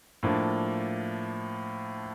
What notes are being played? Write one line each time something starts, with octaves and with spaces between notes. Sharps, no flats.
A2 F3 A#3 D4